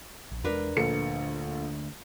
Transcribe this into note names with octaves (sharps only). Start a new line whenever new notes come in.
A#1
E2 G3 G#3 D4 A#4 B4
A#1 D3 A3 A4 C#7